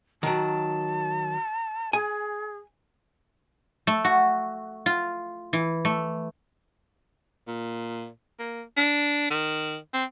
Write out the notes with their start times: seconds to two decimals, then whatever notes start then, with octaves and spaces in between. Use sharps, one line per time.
0.23 D#3 F#3 A5
1.93 G#4 G#5
3.87 A3
4.04 F#4
4.86 F4
5.53 E3
5.85 A3
7.47 A#2
8.39 A#3
8.77 D4
9.30 D#3
9.94 C4